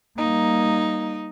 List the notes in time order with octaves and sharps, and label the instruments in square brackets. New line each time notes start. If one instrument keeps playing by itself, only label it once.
[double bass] G3 A#3 [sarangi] D#4